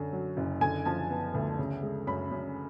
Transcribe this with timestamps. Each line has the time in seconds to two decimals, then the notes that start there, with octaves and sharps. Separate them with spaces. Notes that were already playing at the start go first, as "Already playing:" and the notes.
Already playing: F#2 D3
0.13 F#3
0.37 F#1
0.61 D3 G#5
0.85 F3 A5
1.10 B3
1.34 D2
1.58 C#3
1.83 G#3
2.07 F#2 B5
2.31 F#2